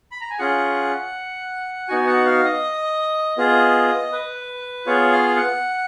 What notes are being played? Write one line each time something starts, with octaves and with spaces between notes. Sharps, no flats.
B5
A#5
G#5
C#4 F4 G#4 F#5
B3 D#4 F#4 G#5
F#5
F5
D#5
B3 F4 G#4 D#5
B4
B3 F4 G#4 C#5
F5
F#5